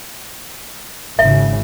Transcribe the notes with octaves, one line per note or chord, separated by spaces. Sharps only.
G#1 C#3 E5